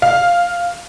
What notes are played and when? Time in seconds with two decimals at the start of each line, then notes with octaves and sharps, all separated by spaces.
0.02 F5